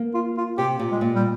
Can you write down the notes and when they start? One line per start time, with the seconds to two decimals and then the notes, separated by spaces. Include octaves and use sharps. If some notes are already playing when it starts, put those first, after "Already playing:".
Already playing: A#3
0.14 F4
0.37 F4
0.58 C3 G4
0.79 A#2
0.92 G#3
1.01 A#2
1.15 G3